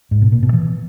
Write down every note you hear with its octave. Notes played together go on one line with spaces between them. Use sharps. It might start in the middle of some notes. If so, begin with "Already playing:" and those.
G#2
B2
A#2
B2
E3